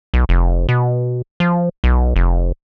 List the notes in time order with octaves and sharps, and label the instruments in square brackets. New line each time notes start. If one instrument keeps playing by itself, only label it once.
[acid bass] B1
F1
B2
F3
B1
F1